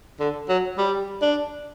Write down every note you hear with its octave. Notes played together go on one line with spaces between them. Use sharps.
D3
F#3
G3
D4